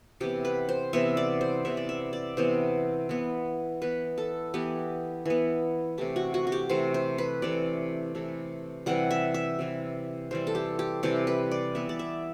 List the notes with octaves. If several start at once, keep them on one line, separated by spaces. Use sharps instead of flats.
C3 E3 B3 G4
B4
C5
C3 E3 B3 E5
D5
C5
C3 E3 B3 E5
D5
E5
D5
C3 E3 B3 C5
E3 B3
E3 B3 B4
A4
E3 B3 G4
E3 B3
C3 E3 A3 G4
F#4
F#4
F#4
G4
C3 E3 A3 C5
C5
B4
C3 E3 A3 D5
C3 E3 A3
C3 E3 G3 F#5
E5
E5
C3 E3 G3
C3 E3 G3 C5
A4
G4
G4
C3 E3 G3 G4
B4
D5
E3 B3 E5
D5
E5